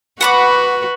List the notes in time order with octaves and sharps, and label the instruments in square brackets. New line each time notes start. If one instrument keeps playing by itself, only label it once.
[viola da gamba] F#4 B4 [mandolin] F#5 B5 D6